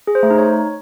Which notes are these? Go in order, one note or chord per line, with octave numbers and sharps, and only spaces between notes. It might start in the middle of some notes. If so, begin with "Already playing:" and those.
G#4
C5
A3
D#4
C#5